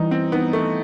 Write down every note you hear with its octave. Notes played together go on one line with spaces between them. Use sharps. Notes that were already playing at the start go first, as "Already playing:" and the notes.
Already playing: E3 G3 D#4
C4
B3 D#4
A3